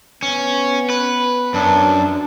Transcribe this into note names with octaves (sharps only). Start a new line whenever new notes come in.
B3 C#4
B4
F#2 D4